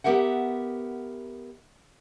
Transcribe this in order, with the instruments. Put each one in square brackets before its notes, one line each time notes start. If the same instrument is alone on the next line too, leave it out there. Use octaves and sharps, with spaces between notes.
[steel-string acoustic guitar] B3 G4 A#4 E5 F#5